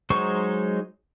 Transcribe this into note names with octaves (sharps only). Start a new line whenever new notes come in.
F#3 G#3 D#4 C5 C#6